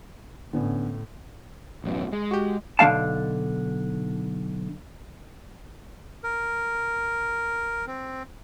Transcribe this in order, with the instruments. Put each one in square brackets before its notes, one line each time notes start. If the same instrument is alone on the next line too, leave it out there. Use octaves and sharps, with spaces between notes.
[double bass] A2 [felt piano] D3 B3 C#4
[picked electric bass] A1 F#2 B2
G#3
[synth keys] F#4 G4
[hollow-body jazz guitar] B1 D3 G#3 F5 A5
[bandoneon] A#4
C4